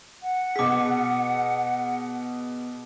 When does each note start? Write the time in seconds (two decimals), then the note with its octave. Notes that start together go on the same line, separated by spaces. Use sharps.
0.23 F#5
0.56 B2 G#4 D6 B6